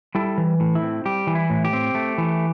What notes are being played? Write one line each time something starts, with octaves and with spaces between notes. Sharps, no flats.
G3 E4 A4
E3
A2
E4
C4
G3 G4
E3
E4
A2
G4
C4
A3
E3